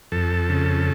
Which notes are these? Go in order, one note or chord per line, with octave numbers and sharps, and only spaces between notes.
F2 A4
C#3